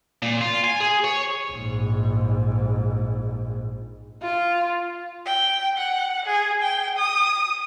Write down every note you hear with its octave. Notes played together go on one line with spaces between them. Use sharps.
A#2
F4
G#5
G#4
C#5
A#1 G#2
F4
G5
F#5
G#4
G5
D#6